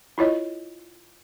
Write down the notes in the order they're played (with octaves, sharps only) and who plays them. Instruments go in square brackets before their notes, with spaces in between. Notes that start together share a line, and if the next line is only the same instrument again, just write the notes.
[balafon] E4 F4 C#5 D#5